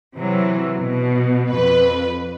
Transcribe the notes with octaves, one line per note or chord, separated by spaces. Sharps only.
C3 E3 F#3
B2
F2 B4